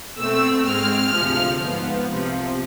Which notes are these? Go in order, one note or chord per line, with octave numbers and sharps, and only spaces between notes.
B2 A3 C4 E6
G#2 G#3 C4 F6
D2 C3 F3 G#3
G#2 F3 B3
C2 C3 F3